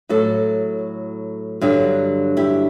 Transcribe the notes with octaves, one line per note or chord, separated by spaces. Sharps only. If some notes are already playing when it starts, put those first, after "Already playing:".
A2 F#3 F#4 A4
G2 D3 F#3
E4 G4